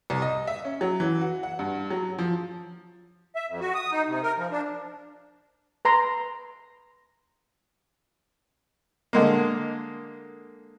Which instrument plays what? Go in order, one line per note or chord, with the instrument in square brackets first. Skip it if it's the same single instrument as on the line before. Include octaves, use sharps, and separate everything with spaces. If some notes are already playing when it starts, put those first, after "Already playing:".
[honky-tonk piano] C2
D#5
E5
C#4
F#3
E3
F#4
F#5
G2
F#3
F3
[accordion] E5
F2
F#4
D#6
D#4
C3
A#4
F3
D4
[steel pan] B4 A#5 C6
[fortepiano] D3 G#3 A#3